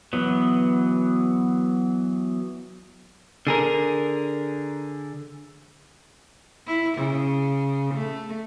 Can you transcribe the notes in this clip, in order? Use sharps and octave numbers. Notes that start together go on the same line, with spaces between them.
E3 F#3 B3
D3 G#4 A#4
E4
C#3
A3